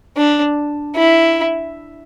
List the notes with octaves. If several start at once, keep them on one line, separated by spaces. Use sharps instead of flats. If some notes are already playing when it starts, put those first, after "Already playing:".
D4
E4